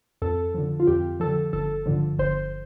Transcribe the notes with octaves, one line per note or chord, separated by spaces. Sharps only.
F2 A4
D3 F3
F4
F2 G4
D3 F3 A4
G1 A4
G2 D3 F3
G1 C5